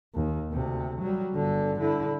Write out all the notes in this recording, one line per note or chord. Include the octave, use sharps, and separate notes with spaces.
D#2
D2 C3
F#3 G3
G1 D3
D3 E4